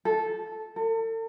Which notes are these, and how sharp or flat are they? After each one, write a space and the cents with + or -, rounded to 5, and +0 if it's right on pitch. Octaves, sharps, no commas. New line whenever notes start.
A4 -10
A4 +40